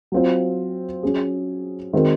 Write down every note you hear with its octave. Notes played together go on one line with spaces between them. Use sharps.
F#3 C4 F4 C5
F#3 C#4 G#4
D#3 G#3 C4 F#4 A#4